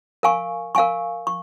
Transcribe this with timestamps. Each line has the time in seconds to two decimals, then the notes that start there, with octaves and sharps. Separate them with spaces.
0.23 A#4 F5 G#5 C#6
0.75 A#4 F5 G#5 C#6
1.27 C#6